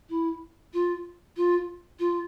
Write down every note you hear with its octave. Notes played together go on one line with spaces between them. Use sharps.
E4
F4
F4
F4